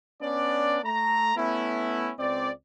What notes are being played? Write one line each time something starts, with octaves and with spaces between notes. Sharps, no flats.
B3 C#4 D4 D5
A3 A#5
A3 B3 C#4 E4
C#2 C4 D5